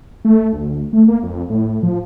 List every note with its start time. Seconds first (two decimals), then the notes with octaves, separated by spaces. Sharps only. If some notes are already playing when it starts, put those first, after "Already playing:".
0.25 A3
0.53 D2
0.93 A3
1.08 A#3
1.23 F2
1.50 A2
1.83 F3